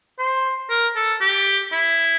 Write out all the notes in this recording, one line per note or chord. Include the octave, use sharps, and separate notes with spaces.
C5
A#4
A4
G4
E4